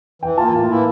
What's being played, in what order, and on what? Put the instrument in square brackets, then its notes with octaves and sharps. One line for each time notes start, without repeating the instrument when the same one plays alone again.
[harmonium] E3 [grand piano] G5
[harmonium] A#3 F4 [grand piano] A5
[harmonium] A2
E3 A#3 E4